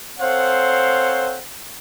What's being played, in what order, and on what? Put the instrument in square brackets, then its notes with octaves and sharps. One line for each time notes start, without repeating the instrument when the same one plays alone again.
[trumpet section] C4 A4 C5 C#5 F5 F#5